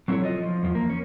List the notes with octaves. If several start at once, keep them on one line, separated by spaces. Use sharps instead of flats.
F#3 C4 E4 G4 A4 C#5
F4 D#5
F3
E2 F3
A#3
C#4